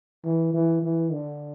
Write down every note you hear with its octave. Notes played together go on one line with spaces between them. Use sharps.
E3
E3
E3
D3